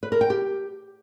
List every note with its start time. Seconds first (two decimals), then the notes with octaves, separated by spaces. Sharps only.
0.03 B4
0.12 A#4
0.21 G5
0.30 G4